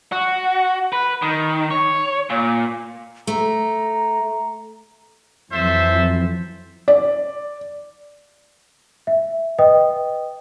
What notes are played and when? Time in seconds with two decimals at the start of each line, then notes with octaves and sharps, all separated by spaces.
0.12 F#4
0.93 B4
1.22 D#3
1.71 C#5
2.30 A#2
3.27 A3 A#5
5.52 F2 E3 F#3 A4 C5 E5
6.88 D5
9.07 E5
9.59 B4 D#5 G5 D#6